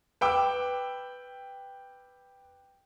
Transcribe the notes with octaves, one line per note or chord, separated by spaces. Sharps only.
B4 G5 D6 E6